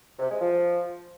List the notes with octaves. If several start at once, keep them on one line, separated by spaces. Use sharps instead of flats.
C3
G#3
F3